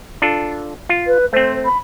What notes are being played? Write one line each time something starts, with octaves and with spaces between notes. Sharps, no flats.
D4 F4 A4
F4
B4
A3 C4 C5
B5